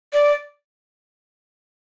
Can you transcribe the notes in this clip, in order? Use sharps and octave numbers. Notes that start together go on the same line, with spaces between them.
D5